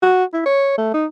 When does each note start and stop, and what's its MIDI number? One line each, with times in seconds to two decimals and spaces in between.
0.03 0.24 66
0.33 0.41 64
0.46 0.76 73
0.78 0.92 57
0.94 1.06 63